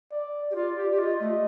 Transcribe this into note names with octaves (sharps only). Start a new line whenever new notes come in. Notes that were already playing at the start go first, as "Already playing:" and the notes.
D5
G4
F4 D5
G4
G4
F4 D#5
A3